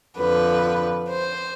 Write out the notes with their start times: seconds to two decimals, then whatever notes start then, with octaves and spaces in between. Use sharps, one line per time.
0.16 F2 D3 F3 B4
1.09 C5